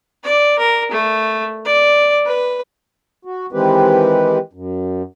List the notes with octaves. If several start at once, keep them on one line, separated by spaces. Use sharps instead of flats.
D5
A#4
A3
D5
B4
F#4
D#3 E3 G#3 C4 G4 B4
F#2